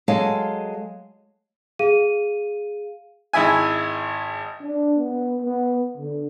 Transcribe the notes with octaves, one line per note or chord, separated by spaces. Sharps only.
F#3 G#3 A4 F5 G#5 A5
G#4 F5 D#7
G#1 E4 E5 G#5
D4
B3
B3
D3